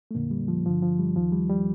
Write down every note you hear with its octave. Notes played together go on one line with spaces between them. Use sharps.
A3
F2 A#2 D3 A#3
G3
F3
G2 D3 F3
F3
G3
D#2 D#3 F3
G3
G3